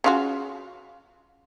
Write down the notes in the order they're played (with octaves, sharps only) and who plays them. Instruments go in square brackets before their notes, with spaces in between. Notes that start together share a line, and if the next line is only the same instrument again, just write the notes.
[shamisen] C#3 F4 F#4